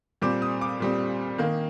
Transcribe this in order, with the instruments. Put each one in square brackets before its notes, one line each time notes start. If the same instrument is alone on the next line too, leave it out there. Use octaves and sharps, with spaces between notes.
[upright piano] A#2 G3 C4 D6
D#6
D6
A#2 G3 C4
D#3 A#3